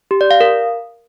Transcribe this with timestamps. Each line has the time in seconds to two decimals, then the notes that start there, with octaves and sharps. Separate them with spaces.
0.11 G4
0.21 D5
0.31 F5
0.40 A#4